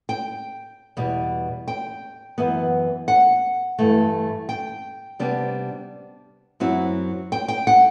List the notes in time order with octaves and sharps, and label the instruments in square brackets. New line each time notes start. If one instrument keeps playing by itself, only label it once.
[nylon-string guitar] G5
E2 B2 G3
G5
F#2 E3 B3
F#5
G2 E3 A3
G5
C3 G3 B3 D4
F#2 F#3 C4 E4
G5
G5
F#5